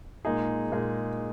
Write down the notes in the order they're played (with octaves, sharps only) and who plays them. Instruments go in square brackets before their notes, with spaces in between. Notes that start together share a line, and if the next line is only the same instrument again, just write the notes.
[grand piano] A#2 G#3 D#4 G#4
A#2 G#3 D#4 G#4